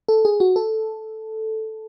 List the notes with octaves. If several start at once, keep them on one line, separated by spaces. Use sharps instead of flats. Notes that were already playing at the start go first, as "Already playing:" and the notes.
A4
G#4
F#4
A4